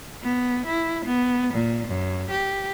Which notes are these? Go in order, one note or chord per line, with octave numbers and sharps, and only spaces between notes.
B3
E4
B3
A#2
F#2
G4